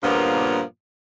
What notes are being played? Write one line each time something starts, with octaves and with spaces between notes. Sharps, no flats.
G2 A#2 C#3 F3 A#3 B3